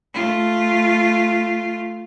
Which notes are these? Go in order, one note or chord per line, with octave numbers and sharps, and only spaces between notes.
A3 F4